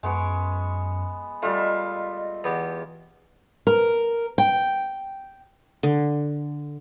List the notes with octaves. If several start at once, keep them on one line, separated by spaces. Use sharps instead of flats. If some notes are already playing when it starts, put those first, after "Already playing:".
F#2 G#3 B3 C#6
G3 A3 F4 D#5 E5
E2 B3 G4
A#4
G5
D3